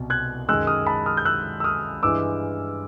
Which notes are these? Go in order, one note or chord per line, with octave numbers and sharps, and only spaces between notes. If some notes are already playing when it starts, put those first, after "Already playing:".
Already playing: C2 B2
F#6 G#6
F#2 D#3 G#3 E6 F#6
D#6 F6
A5 B5
D#6 F6
G6
E6 F#6
E6
D#6 F6
G2 E3 G#3 D6 E6